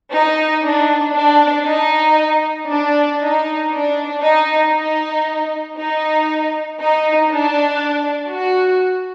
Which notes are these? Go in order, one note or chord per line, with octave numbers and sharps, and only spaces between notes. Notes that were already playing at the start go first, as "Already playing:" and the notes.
D#4
D4
D4
D#4
D4
D#4
D4
D#4
D#4
D#4
D#4
D4
F#4